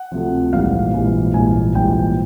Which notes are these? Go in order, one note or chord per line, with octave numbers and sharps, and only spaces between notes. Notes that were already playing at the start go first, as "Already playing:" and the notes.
Already playing: F#5
D2 C3 F3
A#1 G#2 E3 G3 F5
A#1 G#2 E3 G3
A#1 G#2 E3 G3 G#5
A#1 G#2 E3 G3 G5